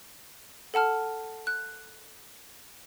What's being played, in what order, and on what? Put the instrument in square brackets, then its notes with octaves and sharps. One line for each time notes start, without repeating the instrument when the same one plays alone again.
[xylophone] A4 F#5 A5 F6
F#6